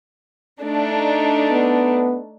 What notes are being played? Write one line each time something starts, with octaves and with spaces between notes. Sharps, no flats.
A3 D4 D#4
B3